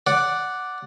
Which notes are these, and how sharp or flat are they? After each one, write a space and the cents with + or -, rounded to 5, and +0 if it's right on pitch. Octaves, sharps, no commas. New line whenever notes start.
D5 +0 F#5 +0